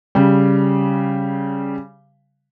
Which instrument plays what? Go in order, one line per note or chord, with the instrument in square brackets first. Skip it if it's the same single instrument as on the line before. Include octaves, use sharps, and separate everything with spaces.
[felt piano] C#3 G3